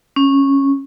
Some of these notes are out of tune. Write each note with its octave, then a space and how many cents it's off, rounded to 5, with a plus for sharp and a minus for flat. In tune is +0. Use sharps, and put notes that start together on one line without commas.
C#4 -10